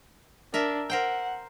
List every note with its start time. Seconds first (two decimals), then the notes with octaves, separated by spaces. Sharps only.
0.54 D4 A#4 E5
0.90 A#4 C5 F#5 G5